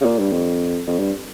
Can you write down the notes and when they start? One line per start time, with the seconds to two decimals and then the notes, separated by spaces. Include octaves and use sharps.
0.01 C#3
0.05 A#2
0.19 G2
0.32 F2
0.87 F2
0.99 G2